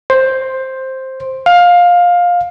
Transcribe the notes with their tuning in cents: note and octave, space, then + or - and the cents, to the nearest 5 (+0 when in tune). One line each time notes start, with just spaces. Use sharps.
C5 +5
F5 +15